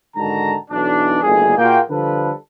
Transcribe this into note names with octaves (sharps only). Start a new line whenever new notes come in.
G#2 D3 D#3 F#4 A5 A#5
B1 E3 D4
G1 D2 D#3 A#3 G#4
A#2 A#3 F4 F#4 G#4 G5
D3 F3 G3 A4 B4